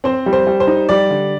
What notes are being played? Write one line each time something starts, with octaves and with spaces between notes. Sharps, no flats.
C4 C5
G3
C5
G3
C5
D#4
G3 D5
D3